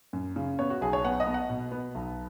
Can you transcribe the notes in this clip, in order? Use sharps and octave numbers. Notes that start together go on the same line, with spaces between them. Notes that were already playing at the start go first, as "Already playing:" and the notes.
F#2
C#3
B3 C#5
F#4
B1 G#4
C#5
B3 F#5
D#5
B3
F#5
B2
B3
B1